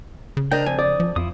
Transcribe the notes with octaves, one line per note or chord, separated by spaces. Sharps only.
C#3
D4 A#4 C5 D#5 G5
F2 G#5
D5 D#6
F3
F2 E4 F4 D#6